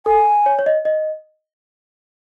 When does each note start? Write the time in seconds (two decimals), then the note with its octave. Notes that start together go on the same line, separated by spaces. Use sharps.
0.06 A4 G#5
0.46 C#5
0.59 C#5
0.66 D#5
0.85 D#5